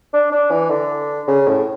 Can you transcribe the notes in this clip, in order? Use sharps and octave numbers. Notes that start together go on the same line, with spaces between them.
D4
D4
E3
D3
C#3
A2